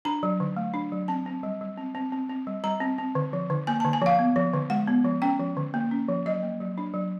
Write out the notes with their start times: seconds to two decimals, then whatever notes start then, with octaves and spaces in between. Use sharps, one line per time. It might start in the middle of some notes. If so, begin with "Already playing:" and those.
0.05 D4 A#5
0.23 F#3
0.40 D3
0.57 A3
0.74 D4
0.92 F#3
1.08 C4 A5
1.26 C4
1.43 G3
1.61 G3
1.77 C4
1.95 C4
2.12 C4
2.29 C4
2.47 G3
2.64 G3 A#5
2.80 C4
2.98 C4
3.15 D3
3.33 F3
3.50 D3
3.67 A#3 G#5
3.80 A5
3.85 D3
3.93 G#5
4.02 F3 F5
4.19 B3
4.36 F3
4.54 D3
4.70 G#3 F#5
4.87 B3
5.04 F3
5.22 C#4 G5
5.39 F3
5.57 D3
5.74 A#3
5.91 C#4
6.09 F3
6.26 F#3 D#5
6.43 A#3
6.61 F#3
6.78 D4
6.94 F#3